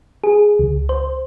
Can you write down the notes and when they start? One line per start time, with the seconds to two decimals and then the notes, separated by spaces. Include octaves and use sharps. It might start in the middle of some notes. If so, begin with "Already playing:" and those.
0.24 G#4
0.59 C#2
0.89 C5